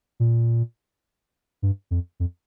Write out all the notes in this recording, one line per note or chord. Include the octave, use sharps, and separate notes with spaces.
A#2
G2
F2
F2